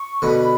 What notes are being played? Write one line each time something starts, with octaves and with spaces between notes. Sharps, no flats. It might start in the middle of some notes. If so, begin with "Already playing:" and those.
Already playing: C#6
B2 D3 B5